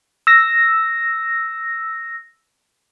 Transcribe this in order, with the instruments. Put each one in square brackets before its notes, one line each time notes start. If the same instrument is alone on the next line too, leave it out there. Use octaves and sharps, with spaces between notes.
[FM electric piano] E6 A#6